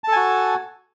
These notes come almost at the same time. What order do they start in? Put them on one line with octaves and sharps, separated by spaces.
A5 A4 G#5 F#4